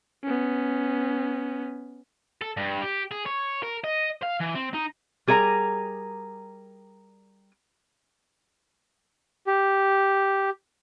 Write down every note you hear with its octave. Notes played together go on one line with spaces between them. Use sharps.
B3 C#4
A4
G2
G4
G#4
C#5
A#4
D#5
F5
E3
C4
D#4
G3 G#4 A#4 C#5 A#5
G4